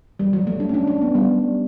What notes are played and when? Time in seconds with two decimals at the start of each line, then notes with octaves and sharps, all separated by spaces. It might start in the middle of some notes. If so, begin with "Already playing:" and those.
0.19 G3
0.33 F#3
0.47 A3
0.60 D4
0.69 C#4
0.74 D4
0.87 D4
1.01 B3
1.15 G3